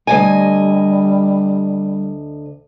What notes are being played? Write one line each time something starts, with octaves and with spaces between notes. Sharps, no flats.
D2 G3 D#5 G#5